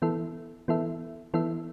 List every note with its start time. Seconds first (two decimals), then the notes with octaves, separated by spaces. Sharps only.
0.02 E3 B3 E4 A4 E5
0.68 E3 B3 E4 A4 E5
1.34 E3 B3 E4 A4 E5